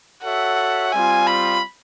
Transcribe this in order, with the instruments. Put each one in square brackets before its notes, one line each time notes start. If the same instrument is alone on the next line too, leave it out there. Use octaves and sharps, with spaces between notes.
[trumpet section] F#4 A4 C#5 E5 [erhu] F#5
[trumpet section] G3 C4 F4 [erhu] G#5
[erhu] B5